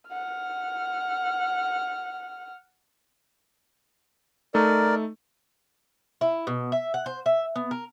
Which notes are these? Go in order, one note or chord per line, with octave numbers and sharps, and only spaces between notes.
F#5 F6
A3 D#4 A4 A#4 D5
E4
B2
E5
F#5
C5
E5
B3
A#4